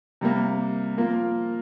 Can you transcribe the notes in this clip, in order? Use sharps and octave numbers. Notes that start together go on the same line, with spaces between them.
C3 G3 A#3
F3 A#3 F4 A#4